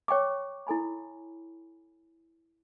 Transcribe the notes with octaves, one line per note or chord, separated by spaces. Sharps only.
C#5 G5 C#6 D6
E4 A4 G#5 B5